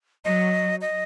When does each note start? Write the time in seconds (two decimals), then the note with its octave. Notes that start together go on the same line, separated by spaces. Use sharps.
0.25 F#3 D#5
0.81 D#5